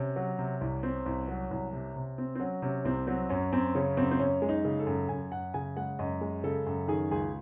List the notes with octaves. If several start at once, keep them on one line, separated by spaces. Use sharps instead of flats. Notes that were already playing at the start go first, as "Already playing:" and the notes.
Already playing: C3 C#4
F#3
C3
C2
C4
C2
F#3
C2
C3
C3
C4
C4
F#3 C#4
C3 C#4
C2 C4
F#3 C4
F#2 C#4
F#2 C4
C#3 C#4
F#2 C4
C4
F#2 C#4
G#3
D#4
C#3
A4
F#2
F#2 G#5
F#2 F#5
C#3 G#5
G#3 F#5
F#2 D#5
G#3
C#3 A4
F#2
D#3 G#4
C#2 G#4